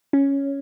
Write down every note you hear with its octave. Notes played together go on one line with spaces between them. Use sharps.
C#4